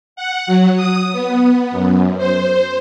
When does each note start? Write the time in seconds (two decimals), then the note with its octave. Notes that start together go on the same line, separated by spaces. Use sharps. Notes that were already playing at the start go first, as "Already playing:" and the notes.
0.16 F#5
0.47 F#3
0.76 D#6
1.13 B3
1.72 F#2
2.18 C5